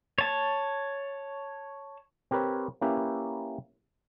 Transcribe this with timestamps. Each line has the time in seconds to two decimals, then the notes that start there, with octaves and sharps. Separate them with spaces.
0.18 C#5 A5
2.31 C4 G4 A#4 B4 C#5
2.81 A#3 C#4 E4 G4 B4